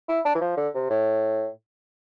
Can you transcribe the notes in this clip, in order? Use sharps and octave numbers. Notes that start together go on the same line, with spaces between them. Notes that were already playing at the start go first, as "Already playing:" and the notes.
E4
D4
E3
F3
D3
C3
A2